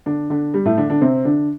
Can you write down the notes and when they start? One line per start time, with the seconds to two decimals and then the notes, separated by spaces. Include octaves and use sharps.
0.06 D3 D4
0.30 D3 D4
0.54 G3
0.66 A2 A3
0.78 D3 D4
0.90 D3 D4
1.01 C3 C4
1.25 D3 D4